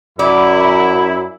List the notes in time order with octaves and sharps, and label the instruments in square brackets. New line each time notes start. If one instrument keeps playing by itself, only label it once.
[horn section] F#2 E4 [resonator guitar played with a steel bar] D5